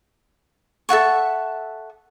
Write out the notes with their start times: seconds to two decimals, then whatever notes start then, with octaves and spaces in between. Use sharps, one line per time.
0.89 A4 E5 F#5 C#6